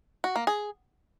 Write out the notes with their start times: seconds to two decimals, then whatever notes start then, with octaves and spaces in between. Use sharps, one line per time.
0.24 F#4
0.36 A#3
0.47 G#4